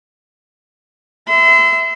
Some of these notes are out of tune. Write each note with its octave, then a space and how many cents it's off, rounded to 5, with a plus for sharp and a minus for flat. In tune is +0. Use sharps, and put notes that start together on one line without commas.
E5 +0 C6 -40